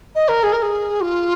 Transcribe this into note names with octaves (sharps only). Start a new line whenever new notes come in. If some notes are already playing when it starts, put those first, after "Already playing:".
D#5
A#4
G#4
A#4
G#4
F4